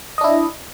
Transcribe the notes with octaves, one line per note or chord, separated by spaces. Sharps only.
D4 E4 D#5